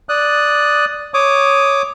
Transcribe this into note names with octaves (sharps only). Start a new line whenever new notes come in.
D5 D#6 F#6
C#5 D6 D#6